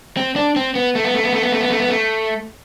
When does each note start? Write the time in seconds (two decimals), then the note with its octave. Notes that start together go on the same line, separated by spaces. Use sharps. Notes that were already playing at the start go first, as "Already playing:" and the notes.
0.17 C4
0.36 D4
0.56 C4
0.75 B3
0.95 A3
1.05 B3
1.14 A3
1.24 B3
1.33 A3
1.42 B3
1.52 A3
1.61 B3
1.70 A3
1.80 B3
1.89 A3